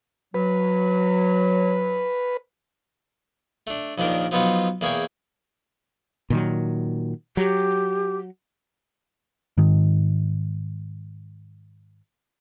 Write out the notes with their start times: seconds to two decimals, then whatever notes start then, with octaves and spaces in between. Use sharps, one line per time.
0.34 F#3 B4
3.67 A3 D4
3.98 A#1 D#2 D#3 D4 A#4
4.31 F3 F#3 B3 D#4 F4
4.81 E2 A#3 G#4 C#5 G5 G#5
6.30 A#2 D#3 F#3
7.37 F#3 G4
9.58 G#2 D#3